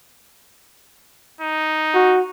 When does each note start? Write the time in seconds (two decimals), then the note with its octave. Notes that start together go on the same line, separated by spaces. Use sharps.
1.41 D#4
1.94 F#4